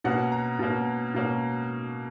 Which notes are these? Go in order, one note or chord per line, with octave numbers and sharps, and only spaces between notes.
B2 A#3 C#4 F#5
A#5
B2 A#3 C#4
B2 A#3 C#4